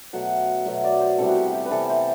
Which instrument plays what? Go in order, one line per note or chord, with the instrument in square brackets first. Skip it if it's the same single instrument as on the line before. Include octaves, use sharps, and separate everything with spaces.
[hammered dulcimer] B2 F#3 A3 F#5
B2 F#3 A3 E5
D5
C5
C3 E3 G3 B3 A4
F#4
G4
G4
B4
C3 E3 G3 B3 A4
C5